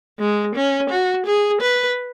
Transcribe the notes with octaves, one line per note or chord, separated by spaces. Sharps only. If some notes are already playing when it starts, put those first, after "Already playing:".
G#3
C#4
F#4
G#4
B4